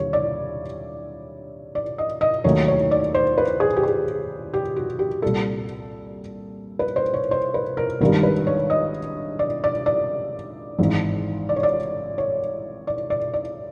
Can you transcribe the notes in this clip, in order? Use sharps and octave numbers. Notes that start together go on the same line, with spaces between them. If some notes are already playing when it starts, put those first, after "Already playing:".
Already playing: D#2 D3 G3 C#5
D5
D5
D#5
D#5
D#2 D#3 F#3 A3 C#5
C#5
D5
C5
B4
G#4
G4
G#4
G4
F#4
G4
C2 A#2 G3 A4
B4
C5
C#5
C5
B4
A#4
G#1 G2 D#3 G3 A#4
B4
C#5
D#5
D5
D5
D5
G#1 G#2 E3
D5
C#5
D5
C#5
D5
D5
D5